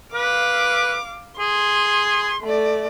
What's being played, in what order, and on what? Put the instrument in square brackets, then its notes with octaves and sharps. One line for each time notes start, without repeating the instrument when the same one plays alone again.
[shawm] B4 [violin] F5 D6
[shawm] G#4 [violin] C6
[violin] A3 D5